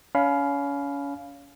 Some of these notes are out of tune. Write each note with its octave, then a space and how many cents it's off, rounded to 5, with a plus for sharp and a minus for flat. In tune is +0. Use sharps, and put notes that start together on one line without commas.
C#4 +30 F5 +0 B5 +0